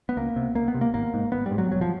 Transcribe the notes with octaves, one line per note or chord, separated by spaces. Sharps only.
B3
C#2 A#3
C3
C#2 A#3
B3
C3
A#3
G#1 A#3
G#2
G#1 B3
G3
G#2
F#3
E1 F#3
F3